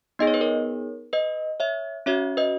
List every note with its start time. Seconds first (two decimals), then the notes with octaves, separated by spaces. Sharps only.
0.19 B3 D#4 G#4 D#5
0.27 C#5
0.34 B4
0.41 A#4 C#5
1.13 B4 D#5
1.60 C#5 E5
2.06 C#4 F#4 C#5 E5
2.37 B4 D#5